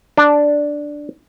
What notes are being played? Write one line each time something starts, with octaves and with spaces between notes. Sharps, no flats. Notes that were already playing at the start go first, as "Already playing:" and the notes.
D4